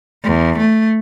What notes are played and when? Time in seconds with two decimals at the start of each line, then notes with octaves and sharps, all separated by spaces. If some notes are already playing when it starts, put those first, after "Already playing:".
0.24 E2
0.58 A3